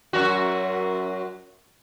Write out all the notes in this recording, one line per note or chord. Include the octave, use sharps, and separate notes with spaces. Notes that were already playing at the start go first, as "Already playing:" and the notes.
F#2 F#4